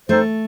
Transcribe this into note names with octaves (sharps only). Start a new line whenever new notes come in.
A3 C4 D#4 A4 C5